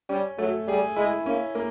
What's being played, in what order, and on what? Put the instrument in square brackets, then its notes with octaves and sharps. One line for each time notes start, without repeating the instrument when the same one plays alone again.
[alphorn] G3 [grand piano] C#4
[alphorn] F#3 [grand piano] A3
[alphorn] G3 [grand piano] G#4
[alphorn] G#3 [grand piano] E4
[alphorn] A#3 [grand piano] C#4
[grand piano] A#3